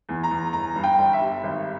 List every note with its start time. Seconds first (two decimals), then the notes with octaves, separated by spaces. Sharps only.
0.09 E2
0.23 A#5
0.31 E2
0.53 G1 A#5
0.76 G2
0.83 G5
0.98 G1
1.13 E5
1.21 G3
1.43 G#1